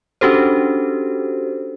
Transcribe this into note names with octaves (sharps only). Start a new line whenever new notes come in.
C#4 D4 F#4 G4 A4 C5